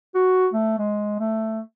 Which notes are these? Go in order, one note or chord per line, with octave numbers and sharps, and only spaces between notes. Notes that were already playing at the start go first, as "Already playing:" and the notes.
F#4
A3
G#3
A3